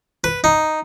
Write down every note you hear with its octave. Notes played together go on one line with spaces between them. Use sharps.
B4
D#4